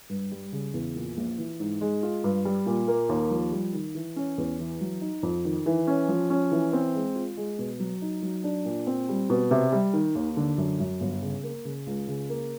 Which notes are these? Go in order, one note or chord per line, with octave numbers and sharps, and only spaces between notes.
G2
G3
C#3
E2
A#2
A#1
E3
G#2
G#3
F4
G2
G3
A#2
A#3
D#2
F3
G3
D#3
E3
C#4
E2
E3
F#3
D#4
F2
D#3
E3
C#4
F3
C#4
E3
C4
G#3
F4
G#3
B2
F#3
D#4
F#3
D4
A#2
C4
G3
B2
C3
G3
D#3
D#2
D3
F#2
F#2
G1
C#3
A#3
C#3
C#2
C#3
A#3